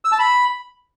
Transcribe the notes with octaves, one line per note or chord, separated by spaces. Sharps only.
E6
A5
B5